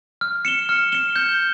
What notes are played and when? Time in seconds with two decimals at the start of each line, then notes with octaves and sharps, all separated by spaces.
0.21 F6
0.45 C#7 E7 G7
0.69 F6
0.92 C#7 E7 G7
1.16 G6